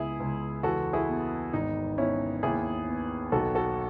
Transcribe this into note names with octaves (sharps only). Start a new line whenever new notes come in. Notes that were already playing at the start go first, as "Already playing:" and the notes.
Already playing: C#2 B3 E4 G#4
C#2
E2 F#4 A4
E4 G#4
B3
G#1 D#4
B3 C#4 E4
D#2 E4 G#4
B3
B1 F#4 A4
F#4 A4